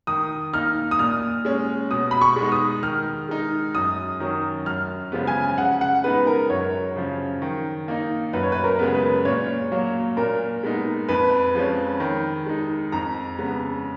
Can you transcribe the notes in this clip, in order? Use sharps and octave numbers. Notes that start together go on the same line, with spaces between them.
D#3 D#6
A#3 D#4 F6
D#6
A#2 F6
G#3 C#4
B2 D#6
B5
C#6
G#3 B3 D#4
D#6
D#3 F6
G#3 D#4
F#2 D#6
D#3 F#3 C#4
F#2 F6
C#3 F3 G#3 B3
G#5
C#3 F#5
F#5
G#3 B3 D#4 B4
A#4
F#2 C#5
C#3 F3
D#3
A#3 D#4
F#2 B4
C#5
B4
A#4
C#3 G#3 B3
B4
A#2 C#5
F#3 A#3
A#2 A#4
G#3 B3 D#4
F2 B4
F3 G#3 C#4
D#3
G#3 D#4
F2 A#5
C#3 G#3 B3